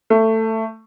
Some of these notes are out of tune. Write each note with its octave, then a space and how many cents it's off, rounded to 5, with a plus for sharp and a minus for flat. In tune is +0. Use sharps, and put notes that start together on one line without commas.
A3 +15